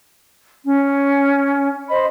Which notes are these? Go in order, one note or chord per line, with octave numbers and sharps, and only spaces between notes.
C#4
C5 D#5 B5